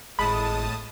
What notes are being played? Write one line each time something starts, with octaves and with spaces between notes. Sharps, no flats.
G#1 A2 G#3 A5 B5 D#6